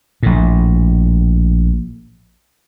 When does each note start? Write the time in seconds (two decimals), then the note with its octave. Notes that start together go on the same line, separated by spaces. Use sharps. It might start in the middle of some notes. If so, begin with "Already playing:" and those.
0.23 A#1 A2